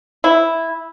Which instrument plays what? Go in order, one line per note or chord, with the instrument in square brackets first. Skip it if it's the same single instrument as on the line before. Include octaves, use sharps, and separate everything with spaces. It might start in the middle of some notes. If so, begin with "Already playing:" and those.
[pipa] E4